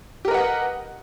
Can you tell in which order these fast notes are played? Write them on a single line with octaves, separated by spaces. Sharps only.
G4 A#4 B4 F#5 D#5